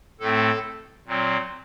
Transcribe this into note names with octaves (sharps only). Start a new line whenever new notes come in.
A2 A3 C4 A4
A#2 F#3 C4